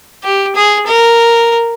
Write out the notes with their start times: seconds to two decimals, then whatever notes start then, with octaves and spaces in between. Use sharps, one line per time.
0.24 G4
0.56 G#4
0.87 A#4